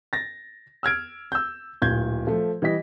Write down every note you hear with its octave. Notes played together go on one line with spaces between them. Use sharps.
A6 A#6
E6 F6 G#6 D7
E6 G6
D1 A#2 G6 G#6
F3 A3
E3 G3 D#5 B6